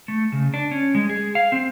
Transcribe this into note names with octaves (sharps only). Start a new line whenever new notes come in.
A3
C#3
D4
C#4
G#3
G#4
F5
C4